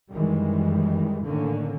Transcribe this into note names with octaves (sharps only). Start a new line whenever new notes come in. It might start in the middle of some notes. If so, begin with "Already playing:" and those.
F#2 D#3 E3 G3 G#3
A2 D3 D#3 A#3 C#4